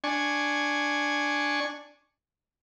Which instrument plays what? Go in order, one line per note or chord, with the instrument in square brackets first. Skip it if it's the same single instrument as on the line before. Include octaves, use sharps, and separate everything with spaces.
[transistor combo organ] D4 G#5 C#6